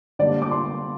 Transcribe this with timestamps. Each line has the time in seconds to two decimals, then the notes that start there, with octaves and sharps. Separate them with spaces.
0.19 D3 G3 A#3 D5
0.42 D6
0.51 C6